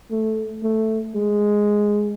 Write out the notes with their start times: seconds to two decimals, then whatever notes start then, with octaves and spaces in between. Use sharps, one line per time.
0.11 A3
0.63 A3
1.15 G#3